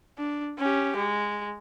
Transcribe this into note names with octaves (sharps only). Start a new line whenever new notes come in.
D4
C#4 G4
G#3